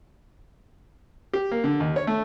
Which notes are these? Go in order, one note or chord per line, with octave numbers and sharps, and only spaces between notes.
G4
A#3
D3
D#2
C#5
A3